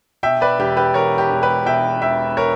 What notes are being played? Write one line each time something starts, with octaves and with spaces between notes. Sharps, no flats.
B2 E5 G5
B4 D5
E1 G4
G4 B4
E2 A#4 C#5
G4
E1
G4 B4
B2 E5 G5
E1 E5 G5
A#4 C#5